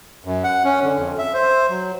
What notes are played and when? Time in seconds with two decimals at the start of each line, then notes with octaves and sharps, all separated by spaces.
0.25 F#2
0.44 F#5
0.64 C#4
0.83 D3
0.97 F2
1.18 E5
1.34 C5
1.69 F#3